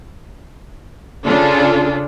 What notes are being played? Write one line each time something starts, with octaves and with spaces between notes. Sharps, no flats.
C#3 D4 F4 G#4 A4